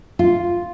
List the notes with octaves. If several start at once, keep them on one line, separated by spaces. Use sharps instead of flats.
F4